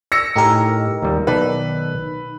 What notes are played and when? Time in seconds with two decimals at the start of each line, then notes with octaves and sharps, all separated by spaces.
0.12 E6 A#6 C#7
0.36 A2 D#4 G4 A#4 G#5
1.02 D#2 G3
1.27 B1 D#3 B4 D5 A5